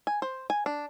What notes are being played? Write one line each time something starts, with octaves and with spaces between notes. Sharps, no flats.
G#5
C5
G#5
D4